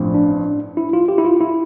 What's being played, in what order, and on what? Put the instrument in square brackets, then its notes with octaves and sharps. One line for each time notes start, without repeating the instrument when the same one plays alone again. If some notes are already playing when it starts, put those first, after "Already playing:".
Already playing: [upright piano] A1 G2 F3 C4
[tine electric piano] D4
E4
F4
G4
E4
F4
E4